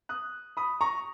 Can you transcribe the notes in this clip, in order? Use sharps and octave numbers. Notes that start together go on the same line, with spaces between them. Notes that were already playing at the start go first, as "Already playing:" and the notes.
D#6 F#6
B5 D#6
A#5 C#6